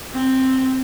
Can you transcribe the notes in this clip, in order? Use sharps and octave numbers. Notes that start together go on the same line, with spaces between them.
C4